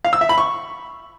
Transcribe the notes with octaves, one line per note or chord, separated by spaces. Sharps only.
F5
E6
E5
B5
C#6